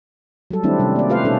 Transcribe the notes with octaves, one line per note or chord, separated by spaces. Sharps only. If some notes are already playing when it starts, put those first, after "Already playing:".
F#3 G3 A4
D#3 G3 A3 C4 D4 E4
C3 G3 C#4
A#3 D5
A3 F4 G4 B4 C5 F5
B2 C#4 D#4 A4